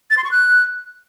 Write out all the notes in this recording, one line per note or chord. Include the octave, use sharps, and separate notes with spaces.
A6
C6
C#6
F#6